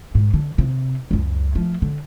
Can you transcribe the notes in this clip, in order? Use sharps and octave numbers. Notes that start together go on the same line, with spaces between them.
G#2
D3
C3
C#2 F#2
F3 A3
D3